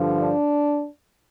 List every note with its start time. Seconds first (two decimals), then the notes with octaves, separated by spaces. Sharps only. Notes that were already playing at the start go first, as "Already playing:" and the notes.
Already playing: G2 D3 F3
0.20 D4